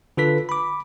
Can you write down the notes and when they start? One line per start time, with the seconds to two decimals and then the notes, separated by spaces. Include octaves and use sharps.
0.17 D3 F4 A4 B4 B6
0.49 B5 D6